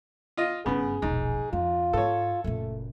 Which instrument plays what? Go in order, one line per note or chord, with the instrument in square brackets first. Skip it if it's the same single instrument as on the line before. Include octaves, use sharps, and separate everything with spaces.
[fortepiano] F4 D#5
[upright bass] G1 G2 [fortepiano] C#3 B3 [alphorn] G#4
[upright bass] E1 A#1 [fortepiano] G#2
[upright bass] F2 [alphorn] F4
[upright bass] G#2 [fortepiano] A4 C#5
[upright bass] F#1 A#2 [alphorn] A3